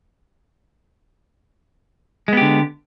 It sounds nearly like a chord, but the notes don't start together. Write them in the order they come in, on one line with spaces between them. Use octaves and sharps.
G#3 B3 G4 D3